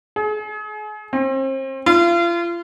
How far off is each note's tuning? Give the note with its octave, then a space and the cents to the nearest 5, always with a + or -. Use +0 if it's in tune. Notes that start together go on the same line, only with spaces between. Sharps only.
G#4 +35
C4 +35
F4 -35